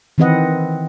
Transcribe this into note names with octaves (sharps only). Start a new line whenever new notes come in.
D#3 E3 C4 B4 D#5 F#5